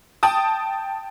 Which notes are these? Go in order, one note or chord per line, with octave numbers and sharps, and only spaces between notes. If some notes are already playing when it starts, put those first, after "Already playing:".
G5 A5 D#6